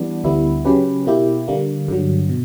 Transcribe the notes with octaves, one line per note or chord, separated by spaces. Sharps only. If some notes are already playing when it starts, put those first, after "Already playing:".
Already playing: E3 G3 B3 D4
D2 D3 G3 B3 E4
C#3 F#3 C#4 G4 B4
B2 A#3 E4 G4
D3 G3 A#3
G2 D3 F#3
B2